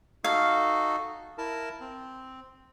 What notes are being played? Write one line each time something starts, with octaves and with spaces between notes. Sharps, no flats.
D#4 F#4 A4 F5
E4 A#4 A5
C4